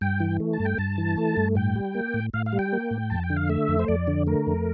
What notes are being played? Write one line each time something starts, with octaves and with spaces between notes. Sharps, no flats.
G2 G5
E3
A3
A5
G2
G5
G2 A5
E3
A3
G2
A2 G5
G3
A#3
A2
A2 F5
F5
G3
G5
A#3
A2
F2 A5
G5
D3
F5
A3 E5
F2
C5
F2 D5
D3
A3 A#4
F2